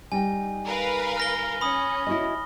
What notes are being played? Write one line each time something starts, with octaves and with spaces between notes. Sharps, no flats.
G3 D#4 G5 G#5
A#4 B4 F5
F6 A#6 G7
C#4 B5 D#6
E4 F#4 D#5